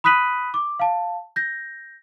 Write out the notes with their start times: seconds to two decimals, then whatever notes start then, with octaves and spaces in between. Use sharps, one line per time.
0.04 B5 D#6 F#6 B6 D#7 F#7
0.54 D6
0.80 F5 A5
1.36 G6 A#6